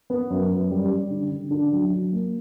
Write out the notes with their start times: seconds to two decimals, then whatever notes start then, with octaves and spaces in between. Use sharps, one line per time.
0.10 B3
0.30 F#2
0.50 F#2
0.71 G3
0.91 G3
1.10 D3
1.31 D3
1.51 D3
1.72 F#3
1.92 F#3
2.12 A#3